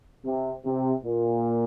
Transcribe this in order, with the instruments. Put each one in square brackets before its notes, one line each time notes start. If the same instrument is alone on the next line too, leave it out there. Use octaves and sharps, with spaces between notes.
[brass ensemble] C3
C3
A#2